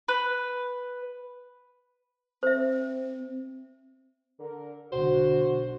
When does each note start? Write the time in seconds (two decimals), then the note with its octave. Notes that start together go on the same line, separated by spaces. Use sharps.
0.08 B4
2.43 C4 C5 E5
4.39 D3 A#4
4.92 B1 D3 F#4 C5